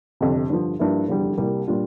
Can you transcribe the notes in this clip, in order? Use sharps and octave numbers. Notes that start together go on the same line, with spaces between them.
G1 F2 C3
G2 D3 F3
G2 F3 A#3 E4
F1 E2 D3 G3
C2 C3 G3 A#3
A#2 G3 D4 F4